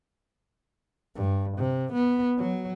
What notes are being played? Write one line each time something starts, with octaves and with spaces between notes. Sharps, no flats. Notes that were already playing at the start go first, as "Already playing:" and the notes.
G2
C3
B3
F#3